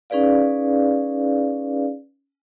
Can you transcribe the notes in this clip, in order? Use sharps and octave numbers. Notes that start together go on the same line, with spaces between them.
C#4 D#4 G#4 B4 D5 F5